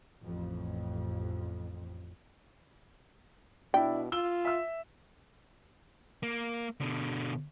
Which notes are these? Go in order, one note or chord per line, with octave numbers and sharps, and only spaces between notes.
A1 F2
B2 D4 E4 G5
F4 E6 G7
E5 E6
A#3
B2 D3